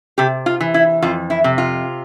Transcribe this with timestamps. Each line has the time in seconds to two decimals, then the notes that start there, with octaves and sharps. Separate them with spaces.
0.18 C3 G4
0.46 F4
0.60 E3
0.74 E4
1.02 F2 F4
1.30 E4
1.44 C3
1.58 F4